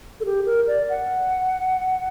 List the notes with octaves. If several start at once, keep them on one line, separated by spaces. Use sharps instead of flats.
A4
G4
A#4
D5
F#5